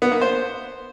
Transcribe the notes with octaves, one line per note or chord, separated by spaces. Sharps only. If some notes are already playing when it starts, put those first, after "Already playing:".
B3
A#3
C5